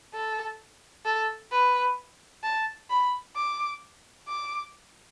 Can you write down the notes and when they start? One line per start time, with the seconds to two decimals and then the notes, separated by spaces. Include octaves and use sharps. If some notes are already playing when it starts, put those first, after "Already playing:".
0.14 A4
1.05 A4
1.51 B4
2.43 A5
2.90 B5
3.36 D6
4.28 D6